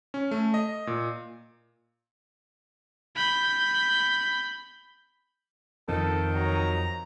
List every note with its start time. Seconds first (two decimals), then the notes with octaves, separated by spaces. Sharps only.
0.14 C#4
0.31 A3
0.54 D#5
0.87 A#2
3.16 B5 G6
5.88 F2 D#3 F3 C4 A4
6.34 F#3 A#5